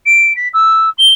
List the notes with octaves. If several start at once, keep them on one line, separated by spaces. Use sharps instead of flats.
D7
B6
E6
G7